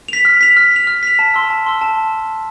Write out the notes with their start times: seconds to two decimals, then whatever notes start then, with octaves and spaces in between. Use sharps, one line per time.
0.08 B6 F7
0.25 F6
0.41 B6 F7
0.57 F6
0.71 B6 F7
0.87 F6
1.03 B6 F7
1.19 A5
1.34 C6 E6
1.50 A5
1.66 C6 E6
1.81 A5